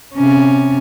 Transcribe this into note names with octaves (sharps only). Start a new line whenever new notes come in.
C3 C#4